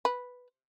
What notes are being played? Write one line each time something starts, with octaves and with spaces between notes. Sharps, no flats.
B4